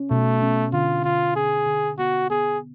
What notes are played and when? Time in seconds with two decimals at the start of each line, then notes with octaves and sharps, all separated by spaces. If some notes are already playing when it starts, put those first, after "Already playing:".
Already playing: C#4
0.11 B2 A3
0.42 C#4
0.73 D3 F4
1.04 D3 F4
1.36 C#4 G#4
1.67 D3
1.98 B3 F#4
2.30 B3 G#4